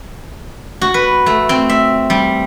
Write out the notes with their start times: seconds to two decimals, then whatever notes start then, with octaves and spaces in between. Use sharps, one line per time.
0.81 F#4
0.94 B4
1.26 A3
1.49 C4
1.69 E5
2.10 G3